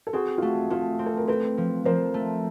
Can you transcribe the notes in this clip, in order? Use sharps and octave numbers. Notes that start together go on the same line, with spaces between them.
A4
C4 F#4 G#4
F4
A3 F#4
A3 F4
C4
A4
A#4
C4 A4 B4
F3
F3 A#4 C5
A3